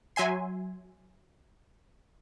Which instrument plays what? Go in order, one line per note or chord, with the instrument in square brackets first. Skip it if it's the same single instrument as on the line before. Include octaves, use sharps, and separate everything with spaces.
[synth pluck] F#3 E5 G#5 C6